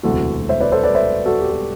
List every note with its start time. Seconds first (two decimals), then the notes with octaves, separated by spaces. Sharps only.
0.03 E1 D2 C3 E3 F#4 A4
0.49 C5 E5
0.60 B4 D5
0.72 A4 C5
0.83 B4 D5
0.95 C5 E5
1.26 F#4 A4
1.41 G4
1.52 G4